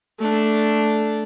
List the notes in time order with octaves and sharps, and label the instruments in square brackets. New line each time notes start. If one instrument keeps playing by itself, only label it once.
[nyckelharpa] A3 D4